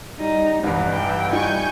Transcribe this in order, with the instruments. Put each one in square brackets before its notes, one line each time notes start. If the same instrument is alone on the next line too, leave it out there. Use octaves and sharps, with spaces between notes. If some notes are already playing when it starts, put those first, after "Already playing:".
[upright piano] G3 [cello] D#4
[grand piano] C2 G2 [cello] E3
[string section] E3 [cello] G5
[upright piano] G3 D#4 F4 [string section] G#5 C#6 G6